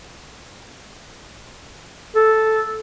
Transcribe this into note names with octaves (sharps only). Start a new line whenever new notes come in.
A4